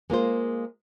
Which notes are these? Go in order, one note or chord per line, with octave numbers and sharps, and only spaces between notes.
G#3 A#3 F4 C5